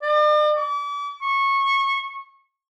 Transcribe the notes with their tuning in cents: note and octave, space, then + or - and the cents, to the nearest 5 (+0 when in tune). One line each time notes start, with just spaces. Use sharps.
D5 +45
D6 -40
C#6 -20